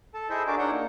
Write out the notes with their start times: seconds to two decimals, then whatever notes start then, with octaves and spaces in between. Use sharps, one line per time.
0.14 A4 A5
0.30 E4 G#4 A4 C5 D#5 E5
0.47 D4 F#4 G#4 A#4 A5 D6
0.59 D4 D#4 C#5 F#5 G6
0.71 A#3